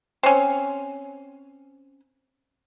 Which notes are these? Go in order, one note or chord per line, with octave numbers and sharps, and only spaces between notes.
C4 C#4